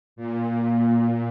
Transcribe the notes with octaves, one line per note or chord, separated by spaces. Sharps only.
A#2